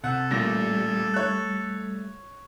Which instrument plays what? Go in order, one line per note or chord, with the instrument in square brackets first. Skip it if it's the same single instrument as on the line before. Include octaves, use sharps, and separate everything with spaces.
[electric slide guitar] C3 [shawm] A4 [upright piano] F#5
[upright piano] A1 A#2 A#6 [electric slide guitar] G3 A3
[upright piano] C#5 F#6